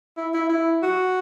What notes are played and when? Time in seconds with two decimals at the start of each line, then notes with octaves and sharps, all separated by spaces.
0.17 E4
0.34 E4
0.49 E4
0.82 F#4